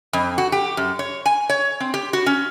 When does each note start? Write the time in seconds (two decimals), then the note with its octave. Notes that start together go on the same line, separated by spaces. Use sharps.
0.13 F2
0.38 F#4
0.52 G4
0.77 F#2
0.99 C#5
1.26 G#5
1.50 C#5
1.80 C4
1.94 G4
2.13 F#4
2.26 C#4